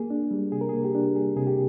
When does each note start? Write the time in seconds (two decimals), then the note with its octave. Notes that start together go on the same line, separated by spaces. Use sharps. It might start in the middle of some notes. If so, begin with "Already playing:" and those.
Already playing: A#3 G#4
0.10 D4
0.31 G3
0.52 C3 G#4
0.61 A#4
0.69 A#3 G#4
0.84 G4
0.95 D4
1.15 G3 G#4
1.36 C3 G#4
1.47 G4